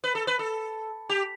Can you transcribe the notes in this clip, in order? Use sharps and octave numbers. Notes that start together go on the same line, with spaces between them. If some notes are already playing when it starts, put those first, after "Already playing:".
B4
A4
B4
A4
G4